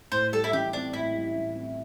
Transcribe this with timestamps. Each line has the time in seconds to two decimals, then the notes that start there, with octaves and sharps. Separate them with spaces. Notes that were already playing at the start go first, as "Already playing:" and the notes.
0.12 A2 C5
0.32 G3 A4
0.44 E4
0.53 A1 G4
0.73 C4 D4
0.93 A2 E4
1.14 G3
1.35 A1
1.55 C4